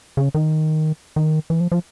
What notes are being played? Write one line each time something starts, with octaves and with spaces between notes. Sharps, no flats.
C#3
D#3
D#3
E3
F3
F3